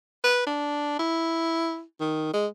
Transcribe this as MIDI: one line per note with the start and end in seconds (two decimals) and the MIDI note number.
0.24 0.44 71
0.47 0.94 62
0.99 1.82 64
2.00 2.34 51
2.34 2.47 56